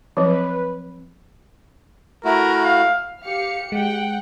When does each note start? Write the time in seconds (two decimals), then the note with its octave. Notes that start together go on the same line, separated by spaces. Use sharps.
0.17 F3 F#3 C4 B4
2.25 A3 E4 F#4 A#4
2.64 F5
3.23 G4 F5 C#7
3.72 G#3 F#5 G5